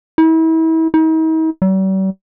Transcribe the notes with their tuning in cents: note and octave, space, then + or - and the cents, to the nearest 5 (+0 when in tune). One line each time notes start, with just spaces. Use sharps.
E4 -35
D#4 +45
G3 -45